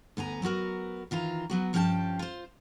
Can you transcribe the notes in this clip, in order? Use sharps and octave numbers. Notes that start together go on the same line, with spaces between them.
D2 B3 G#5 A#5
F#3 B3 F#4 A#4
D#3 E3 F4 A#5
F#3 B3 F#4
G2 F3 C#4 F4 G5 A5
F4 C5